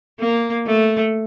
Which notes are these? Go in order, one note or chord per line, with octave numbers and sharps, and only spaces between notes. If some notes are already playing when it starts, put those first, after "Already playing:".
A#3
A3